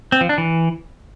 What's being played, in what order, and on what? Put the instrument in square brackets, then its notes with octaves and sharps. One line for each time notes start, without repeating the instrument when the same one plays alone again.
[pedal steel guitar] C4
F3
D4
E3